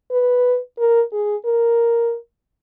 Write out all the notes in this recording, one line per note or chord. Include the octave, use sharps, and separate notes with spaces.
B4
A#4
G#4
A#4